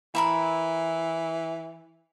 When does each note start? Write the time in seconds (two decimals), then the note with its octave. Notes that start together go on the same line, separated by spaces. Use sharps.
0.15 E3 E4 A#4 B5